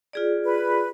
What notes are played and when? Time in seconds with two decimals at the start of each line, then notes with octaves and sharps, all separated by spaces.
0.13 F4 G#4 D5
0.44 B4